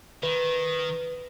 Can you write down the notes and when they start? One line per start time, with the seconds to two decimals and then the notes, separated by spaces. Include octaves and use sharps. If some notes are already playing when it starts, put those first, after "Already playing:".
0.23 D#3 B4